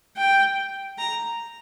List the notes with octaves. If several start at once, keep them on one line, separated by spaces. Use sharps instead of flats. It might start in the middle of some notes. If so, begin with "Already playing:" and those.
G5
A#5